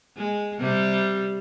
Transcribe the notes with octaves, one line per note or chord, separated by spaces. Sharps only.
G#3
C3 G3